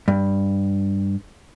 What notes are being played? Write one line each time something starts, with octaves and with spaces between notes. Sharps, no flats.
G2